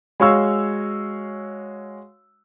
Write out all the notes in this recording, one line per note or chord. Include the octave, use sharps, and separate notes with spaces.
G#3 F#4 C#5 F5 C#6 E6